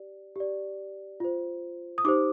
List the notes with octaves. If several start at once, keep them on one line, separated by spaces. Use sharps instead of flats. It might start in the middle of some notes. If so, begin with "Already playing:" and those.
Already playing: G4 D5
G4 D5
F4 C5
D#6
D#4 G4 C5 D6